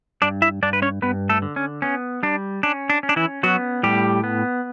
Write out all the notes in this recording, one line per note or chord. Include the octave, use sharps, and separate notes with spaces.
G2 D4 D5
E4 E5
G2 D4 D5
B4
C#4 C#5
G2 B3 B4
A3 A4
D3
C#4
B3 C#4
G3 D4
C#4 D4
D4
C#4
D4
E3 E4
F#3 B3 F#4
A2 G3 G4
B3